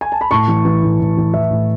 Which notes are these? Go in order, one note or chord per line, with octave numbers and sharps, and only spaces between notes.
G#5
A5
B5
A2 A5 C#6
E3
E3
A2
A2
E3
E3 E5
A2